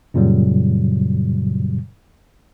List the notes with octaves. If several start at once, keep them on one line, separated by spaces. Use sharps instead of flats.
F#2 A#2 C#3 F#3 G3